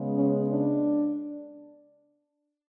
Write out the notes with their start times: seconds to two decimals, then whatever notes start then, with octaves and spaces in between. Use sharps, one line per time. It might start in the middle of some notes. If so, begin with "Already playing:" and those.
Already playing: C#3 G#3 B3
0.15 C#4
0.48 D4